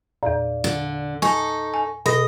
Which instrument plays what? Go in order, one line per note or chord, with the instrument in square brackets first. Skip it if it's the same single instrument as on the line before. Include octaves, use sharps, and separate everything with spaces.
[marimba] E2 A#2 [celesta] D5 F5
[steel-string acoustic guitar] D3
[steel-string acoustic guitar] D#4 A4 [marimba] G#5 [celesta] C#6
[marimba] G#5
[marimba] B2 [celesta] G#4 B4 A#6 [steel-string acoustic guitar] D#5